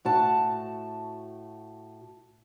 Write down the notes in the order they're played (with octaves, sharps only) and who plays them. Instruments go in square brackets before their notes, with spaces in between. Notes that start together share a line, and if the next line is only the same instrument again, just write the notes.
[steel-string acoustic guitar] A2 F#4 A5